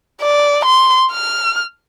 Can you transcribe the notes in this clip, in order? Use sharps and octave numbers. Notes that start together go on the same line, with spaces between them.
D5
C6
F6